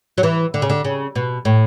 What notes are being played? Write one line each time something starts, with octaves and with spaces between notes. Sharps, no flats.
F#3
E3
D3
C#3
D3
C#3
B2
A2